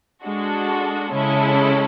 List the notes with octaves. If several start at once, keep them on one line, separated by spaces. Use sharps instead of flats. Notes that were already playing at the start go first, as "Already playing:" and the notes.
G#3 D4 F#4 A4
C#3 G#3 C#4 E4 A4